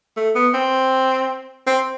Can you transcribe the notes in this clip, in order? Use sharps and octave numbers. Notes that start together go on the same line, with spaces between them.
A3
B3
C4
C4